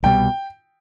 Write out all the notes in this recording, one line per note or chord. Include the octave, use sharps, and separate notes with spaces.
C2 B2 G3 G5